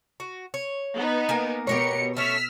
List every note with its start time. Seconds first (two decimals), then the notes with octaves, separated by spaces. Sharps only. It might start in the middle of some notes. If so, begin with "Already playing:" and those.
0.20 F#4
0.54 C#5
0.96 B3 D#4
1.29 A#3 A#4 G#5
1.67 B2 G4 A#4 C#5 C#7
2.17 A3 C#4 E6 F6 B6